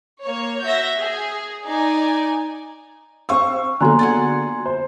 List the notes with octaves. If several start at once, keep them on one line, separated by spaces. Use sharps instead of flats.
A#3 C#5
F#4 E5 G6 A#6
G#4
D#4 D5 G#5
C4 F5 C#6 D#6 E6
D3 F#3 A#3 B3 A4 G#5 A#5 C6
F4 G#4 F#5
C5